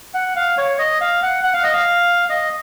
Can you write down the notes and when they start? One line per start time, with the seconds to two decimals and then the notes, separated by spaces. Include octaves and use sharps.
0.14 F#5
0.36 F5
0.58 C#5
0.79 D#5
1.01 F5
1.22 F#5
1.44 F#5
1.54 F5
1.64 D#5
1.73 F5
2.30 D#5